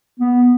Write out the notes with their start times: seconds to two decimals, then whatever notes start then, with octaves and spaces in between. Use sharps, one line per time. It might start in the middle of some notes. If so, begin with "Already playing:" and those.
0.19 B3